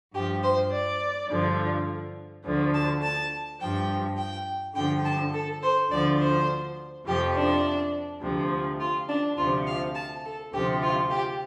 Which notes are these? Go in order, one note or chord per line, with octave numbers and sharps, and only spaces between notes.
G2 F3 G4
C5
D5
G2 D3 F3
D2 D3 F3
A5
A5
G2 F3 G5
G5
G2 D3 F3 G5
A5
A4
C5
D2 D3 F3 D5
C5
F2 C3 F3 G4
D4
D2 C3 F3
F4
D4
D2 C3 F3 F4
F5
A5
A4
D2 C3 F3 G4
F4
G4